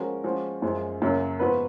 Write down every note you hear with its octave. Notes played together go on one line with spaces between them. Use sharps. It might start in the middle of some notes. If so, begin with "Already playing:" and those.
Already playing: F3 G#3 C#4 F#4 A#4
F3 G#3 C#4 F#4
F#2 F3 G#3
F#2 C#3 F#3 A#3
G#2 F3 B3 F#4 B4